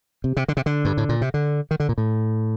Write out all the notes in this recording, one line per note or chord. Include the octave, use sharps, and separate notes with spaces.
C3
C3
D3
C3
D3
G2
A2
A#2
C3
D3
D#3
D3
A#2
A2